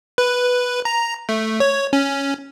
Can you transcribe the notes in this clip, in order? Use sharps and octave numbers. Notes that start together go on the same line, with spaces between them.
B4
A#5
A3
C#5
C#4